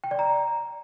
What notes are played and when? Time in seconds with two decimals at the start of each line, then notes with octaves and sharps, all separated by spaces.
0.04 G5
0.11 D5
0.19 A#5